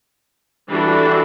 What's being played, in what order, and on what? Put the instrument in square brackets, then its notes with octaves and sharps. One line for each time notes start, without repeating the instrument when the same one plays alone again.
[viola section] E3 G3 D4 F#4 A4